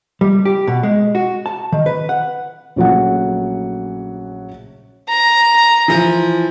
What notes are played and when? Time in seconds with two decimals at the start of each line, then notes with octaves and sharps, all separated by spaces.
0.21 G3
0.45 G4
0.67 B2
0.83 G#3
1.15 F#4
1.46 A5
1.72 D#3
1.86 B4
2.09 F#5
2.76 A#1 C#3 F#3 A3 F#5
5.09 A#5
5.88 E3 F3